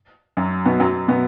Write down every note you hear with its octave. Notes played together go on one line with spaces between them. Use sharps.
F#2 F#3
B2 B3
F#2 F#3
B2 B3